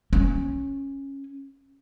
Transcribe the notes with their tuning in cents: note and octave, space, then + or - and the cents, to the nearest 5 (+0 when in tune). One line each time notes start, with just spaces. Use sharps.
C#4 -10